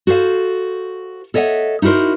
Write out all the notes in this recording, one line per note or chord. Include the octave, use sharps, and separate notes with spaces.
F#4 A4 C5 F5
A4 C#5 D#5 E5 F#5
D#4 E4 F#4 A#4 C5